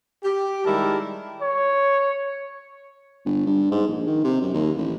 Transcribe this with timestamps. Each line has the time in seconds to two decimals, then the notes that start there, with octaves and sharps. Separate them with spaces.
0.23 G4
0.65 D#3 G3 G#3 E4 A#4 A5
1.42 C#5
3.25 G1
3.46 G2
3.71 G#2
3.87 A#1
4.07 D#3
4.24 C3
4.42 F#2
4.54 D#2
4.77 A1